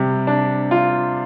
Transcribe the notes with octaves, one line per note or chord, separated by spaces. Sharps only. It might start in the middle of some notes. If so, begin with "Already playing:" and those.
Already playing: C3 G3
D4
F4